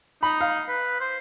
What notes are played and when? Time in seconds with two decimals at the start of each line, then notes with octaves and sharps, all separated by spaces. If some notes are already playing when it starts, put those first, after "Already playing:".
0.23 D#4 B5
0.41 F5
0.68 B4
1.00 C5